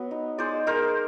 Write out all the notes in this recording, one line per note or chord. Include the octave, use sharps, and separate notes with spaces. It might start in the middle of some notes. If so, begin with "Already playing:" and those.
Already playing: F#3 B3
D#4
G#3 C5 D5
G#3 A#4 C5